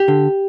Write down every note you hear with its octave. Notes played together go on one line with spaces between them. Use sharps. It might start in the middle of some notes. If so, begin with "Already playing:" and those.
Already playing: G4
D3